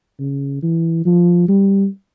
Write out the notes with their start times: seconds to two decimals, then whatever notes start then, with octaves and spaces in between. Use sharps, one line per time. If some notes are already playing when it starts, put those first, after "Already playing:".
0.19 C#3
0.62 E3
1.05 F3
1.48 G3